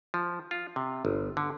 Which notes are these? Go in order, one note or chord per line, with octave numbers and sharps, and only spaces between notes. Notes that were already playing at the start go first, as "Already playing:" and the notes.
F3
F4
C3
G1
D3